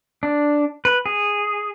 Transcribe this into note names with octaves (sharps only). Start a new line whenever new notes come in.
D4
B4
G#4